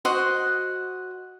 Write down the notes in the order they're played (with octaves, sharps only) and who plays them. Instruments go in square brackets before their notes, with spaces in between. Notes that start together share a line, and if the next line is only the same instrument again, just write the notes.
[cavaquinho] F#4 C5 D#5 F#5